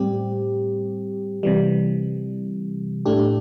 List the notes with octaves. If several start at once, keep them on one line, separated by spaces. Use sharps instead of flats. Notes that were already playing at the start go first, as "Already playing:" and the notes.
Already playing: A2 G3 C4 G4
C3 E3 G3
A2 A3 D4 G4